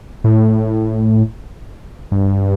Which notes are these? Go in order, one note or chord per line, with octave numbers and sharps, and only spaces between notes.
A2
G2